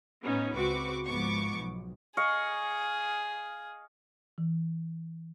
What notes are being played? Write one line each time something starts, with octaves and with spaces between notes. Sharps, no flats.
A2 B3 C#4 D#4
C#2 C4 F#4 B4 C#6 D6
G#1 G#2 F3 B3 C#6 D6
B1
G#4 D#5 F5 C#6
E3